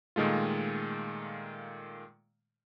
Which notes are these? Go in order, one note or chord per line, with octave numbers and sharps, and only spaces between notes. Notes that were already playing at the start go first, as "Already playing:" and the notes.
A#2 D#3 G#3 A3 F4